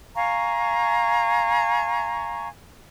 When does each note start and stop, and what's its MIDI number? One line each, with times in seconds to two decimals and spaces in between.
0.15 2.48 77
0.15 2.48 80
0.15 2.48 82
0.15 2.48 85